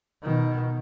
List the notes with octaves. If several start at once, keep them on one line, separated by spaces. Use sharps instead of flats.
B2 D#3